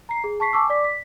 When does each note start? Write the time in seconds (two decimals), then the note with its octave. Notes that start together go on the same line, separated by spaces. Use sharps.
0.09 A#5 C7
0.24 G#4
0.40 A5 C#6 B6 C7
0.53 G#5 A5 C#6 D6 E6
0.69 D5 D6 B6
0.84 B6